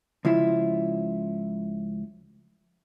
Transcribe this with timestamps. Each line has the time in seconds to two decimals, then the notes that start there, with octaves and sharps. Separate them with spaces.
0.25 C#2 F3 E4